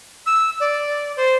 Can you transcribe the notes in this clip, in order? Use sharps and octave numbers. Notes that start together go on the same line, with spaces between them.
E6
D5
C5